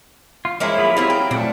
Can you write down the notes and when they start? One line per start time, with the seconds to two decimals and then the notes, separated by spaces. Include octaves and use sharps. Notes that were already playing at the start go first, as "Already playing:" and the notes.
0.45 F4
0.60 F3 G#3 A#3 C#4 E4
0.78 F#3 F4 G#4 B5
0.97 G3 C4 E4 G#4
1.10 G5
1.31 A#2 A3 C4 D4